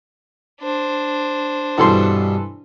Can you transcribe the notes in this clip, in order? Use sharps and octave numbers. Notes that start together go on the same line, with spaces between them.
D4 C5
G2 B2 E3 A4 C6